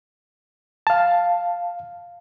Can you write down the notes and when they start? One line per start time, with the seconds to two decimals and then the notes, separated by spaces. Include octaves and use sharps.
0.87 F5 A5